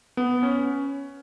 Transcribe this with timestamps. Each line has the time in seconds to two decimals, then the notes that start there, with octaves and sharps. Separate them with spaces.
0.17 B3
0.43 C#4